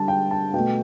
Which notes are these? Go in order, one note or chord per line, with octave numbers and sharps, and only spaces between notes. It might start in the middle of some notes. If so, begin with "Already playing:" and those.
Already playing: D3 G3 A5
G5
A5
B2 A3 G5